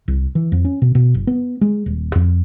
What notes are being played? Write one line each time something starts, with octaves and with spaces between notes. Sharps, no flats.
C2
E3
F2
C#4
B2
B2
F#1
B3
G#3
D#1
F2